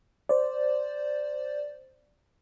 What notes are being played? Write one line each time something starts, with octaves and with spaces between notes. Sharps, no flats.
C5 D5